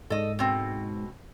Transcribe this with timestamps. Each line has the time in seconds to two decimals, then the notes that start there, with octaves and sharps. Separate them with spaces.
0.10 G#2 A4 D#5
0.39 B2 C4